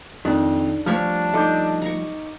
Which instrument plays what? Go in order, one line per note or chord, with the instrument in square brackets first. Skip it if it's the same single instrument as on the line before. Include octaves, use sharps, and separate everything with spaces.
[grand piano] F2 [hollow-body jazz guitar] D#3 [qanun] D4
[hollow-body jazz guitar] F3 G3 A3 [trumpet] D4 [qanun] C5 C#5 [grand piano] F6
[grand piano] D#4 D6 G6 [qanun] A4
[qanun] A#5 C#6